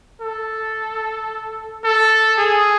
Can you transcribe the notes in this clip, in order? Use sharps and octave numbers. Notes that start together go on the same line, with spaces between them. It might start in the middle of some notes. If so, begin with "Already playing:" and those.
A4
A4
G#4